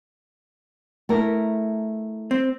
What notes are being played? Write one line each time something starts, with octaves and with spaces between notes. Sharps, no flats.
A3 E4 A#4
C4